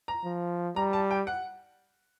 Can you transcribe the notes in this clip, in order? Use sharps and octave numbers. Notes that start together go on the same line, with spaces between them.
A#5
F3
G3 A#5
A5
G5
F#5